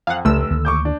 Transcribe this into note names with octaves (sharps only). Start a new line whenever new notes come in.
F2 F5 F#5
F1 C#2 A3 E6
D2 D#3 A#3
C#6 D6 G6
D4